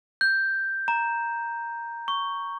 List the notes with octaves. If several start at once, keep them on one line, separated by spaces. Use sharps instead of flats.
G6
A#5
C#6